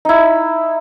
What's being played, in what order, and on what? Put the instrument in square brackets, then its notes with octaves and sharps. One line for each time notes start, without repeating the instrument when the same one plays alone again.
[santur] D#4 E4